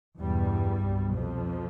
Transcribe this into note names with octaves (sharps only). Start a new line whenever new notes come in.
E2 G2 B2 G3
C2 B2
F2 F3